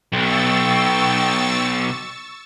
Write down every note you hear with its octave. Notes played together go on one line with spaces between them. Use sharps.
B1 G5 C#6 E6 A6